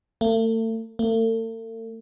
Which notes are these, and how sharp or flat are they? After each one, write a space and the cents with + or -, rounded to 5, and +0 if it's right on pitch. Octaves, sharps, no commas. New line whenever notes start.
A3 +40
A3 +45